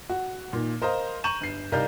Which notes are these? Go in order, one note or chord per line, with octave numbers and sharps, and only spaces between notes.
F#4
A#2 D#3
A#4 C5 D#5 F5 A#5
A#5 C#6 G6 D#7 E7 F#7
G1 C7
C2 D#4 A#4 D5 F5 G6